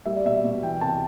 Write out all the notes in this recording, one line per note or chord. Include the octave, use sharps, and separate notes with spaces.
G3 E5
D5
B2 E5
B2
E3 G5
C3 A5